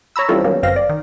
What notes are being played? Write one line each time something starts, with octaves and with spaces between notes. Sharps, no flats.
C#5 A#5 B5 E6
E3 G3 C4 C#4 F4 A4
D#3 F#3 G3 A#3 B3 C#4
G1 F#2 C4 F5 A#6
D5
D#3